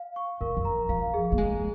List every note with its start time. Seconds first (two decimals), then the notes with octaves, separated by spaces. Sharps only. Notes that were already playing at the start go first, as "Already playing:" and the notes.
Already playing: F5
0.16 C#6
0.41 G#2 A#4
0.57 F2
0.65 A#5
0.89 F3 F5
1.14 G#4
1.32 A#3
1.38 G#3 G#4